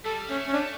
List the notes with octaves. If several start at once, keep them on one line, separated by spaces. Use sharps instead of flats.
G3 A4
A3 C#4
C#4
A3 D4